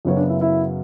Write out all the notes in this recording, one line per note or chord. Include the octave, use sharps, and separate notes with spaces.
F#2 C#3 F#3 B3 C#5
D4 D5
E4 E5
E4 E5